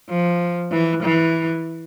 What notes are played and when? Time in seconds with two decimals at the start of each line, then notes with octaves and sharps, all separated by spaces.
0.10 F3
0.71 E3
1.02 E3